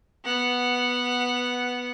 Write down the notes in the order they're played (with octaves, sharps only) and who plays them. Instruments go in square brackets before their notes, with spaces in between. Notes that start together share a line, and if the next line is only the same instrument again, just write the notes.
[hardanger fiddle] B3 F#5